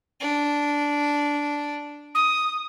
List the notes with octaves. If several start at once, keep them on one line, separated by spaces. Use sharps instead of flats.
D4
D#6